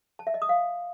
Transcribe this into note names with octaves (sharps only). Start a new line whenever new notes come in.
A5
E5
D#5
D#6
F5